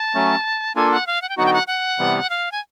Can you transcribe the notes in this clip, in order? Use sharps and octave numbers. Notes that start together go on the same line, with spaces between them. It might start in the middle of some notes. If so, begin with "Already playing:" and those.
Already playing: A5
F#3 A3 C#4
A#3 D4 F4 A4 G#5
F#5
F5
F#5
G5
D3 F#3 B3 D#4 F#4 F#5
G5
F#5
F#5
C3 E3 G3 B3
F5
G#5